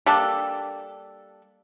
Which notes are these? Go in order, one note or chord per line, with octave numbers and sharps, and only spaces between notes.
G3 A#3 D4 A4